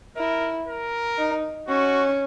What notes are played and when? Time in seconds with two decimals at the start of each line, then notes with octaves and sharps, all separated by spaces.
0.17 E4 A#4
0.68 A#4
1.18 D#4
1.68 C#4 F#4